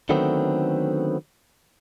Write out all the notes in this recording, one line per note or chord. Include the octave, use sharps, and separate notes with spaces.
D3 D#3 F#3 A3 B3 C4